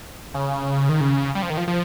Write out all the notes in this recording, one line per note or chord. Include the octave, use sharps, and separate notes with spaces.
C#3
D#3
C#3
G3
F3
D#3
F3
F3